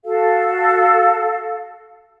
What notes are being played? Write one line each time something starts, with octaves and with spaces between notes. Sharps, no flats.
F#4 A4 F5